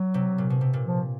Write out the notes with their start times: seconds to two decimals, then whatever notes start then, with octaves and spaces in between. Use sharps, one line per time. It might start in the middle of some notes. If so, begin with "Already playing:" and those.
Already playing: F#3
0.14 C3
0.38 A#2
0.50 B2
0.61 C3
0.73 A#2
0.85 F3